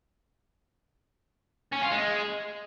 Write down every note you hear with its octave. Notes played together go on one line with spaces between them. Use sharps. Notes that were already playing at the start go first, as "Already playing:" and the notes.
C#4
F4
G#3